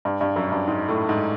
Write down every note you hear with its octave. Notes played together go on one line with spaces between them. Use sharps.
G2
G2
F#2
G2
G#2
A2
G#2